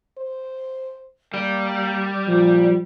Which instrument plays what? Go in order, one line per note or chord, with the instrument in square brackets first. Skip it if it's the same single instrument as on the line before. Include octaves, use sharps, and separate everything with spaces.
[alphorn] C5
[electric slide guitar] G3 [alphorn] A#3
[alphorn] A#2 [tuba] F3